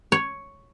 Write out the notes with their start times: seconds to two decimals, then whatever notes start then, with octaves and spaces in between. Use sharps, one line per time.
0.12 C#5